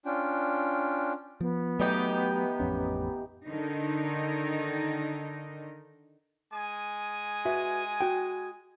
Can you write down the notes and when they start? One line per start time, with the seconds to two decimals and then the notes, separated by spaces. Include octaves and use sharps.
0.06 C#4 D4 F4 G5
1.41 F3 B3
1.80 E3 F#3 A3 D#4 G4
2.60 A1 F2 C#4
3.46 D3 D#3 D#4
6.53 G#3 G#5 D#6
7.45 F#4 B4 E5
8.01 F#4 G5